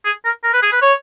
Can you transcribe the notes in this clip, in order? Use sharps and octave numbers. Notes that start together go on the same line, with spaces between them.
G#4
A#4
A#4
B4
G#4
B4
C#5